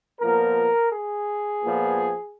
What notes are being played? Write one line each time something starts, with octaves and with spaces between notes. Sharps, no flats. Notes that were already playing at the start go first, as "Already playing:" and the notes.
A#2 F3 B3 A#4
G#4
A#2 F3 B3